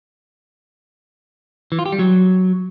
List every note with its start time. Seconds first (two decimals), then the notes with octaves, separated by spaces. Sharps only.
1.72 E3
1.79 F4
1.86 G4
1.92 G3
1.99 F#3